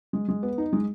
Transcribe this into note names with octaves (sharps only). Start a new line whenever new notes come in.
G#3
G#3
B3
D#4
G#3